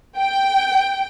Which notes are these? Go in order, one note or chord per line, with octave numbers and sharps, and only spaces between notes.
G5